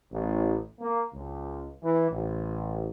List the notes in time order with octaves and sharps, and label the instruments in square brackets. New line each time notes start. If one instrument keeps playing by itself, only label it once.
[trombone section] A1
A#3
C#2
E3
A1